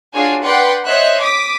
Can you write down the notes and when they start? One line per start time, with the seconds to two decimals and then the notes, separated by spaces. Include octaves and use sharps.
0.14 D4 F4 F#4 G#4 C#5 G#5
0.44 B4 D5 F#5 G5 C6
0.88 C5 C#5 D#5 E5 F#6
1.19 D6 D#6 B6